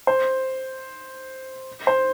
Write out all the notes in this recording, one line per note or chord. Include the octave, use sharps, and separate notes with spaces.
C5
C5